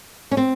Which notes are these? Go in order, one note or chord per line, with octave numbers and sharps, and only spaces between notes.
C#4
C4